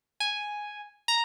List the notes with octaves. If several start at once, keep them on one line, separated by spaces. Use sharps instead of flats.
G#5
A#5